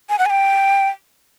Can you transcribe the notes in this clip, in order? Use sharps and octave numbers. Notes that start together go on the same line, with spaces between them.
G#5
F#5
G#5
G5